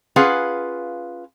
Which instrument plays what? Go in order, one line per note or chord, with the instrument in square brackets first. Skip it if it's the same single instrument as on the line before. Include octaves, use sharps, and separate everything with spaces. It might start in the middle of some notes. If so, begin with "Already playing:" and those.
[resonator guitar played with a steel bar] C#4 F4 G#4 B4 F5 F#5